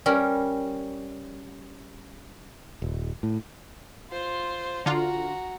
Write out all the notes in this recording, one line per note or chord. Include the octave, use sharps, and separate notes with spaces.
G3 C#4 A#4
D#1
A2
F4 C5
D3 F4 F#4 A#5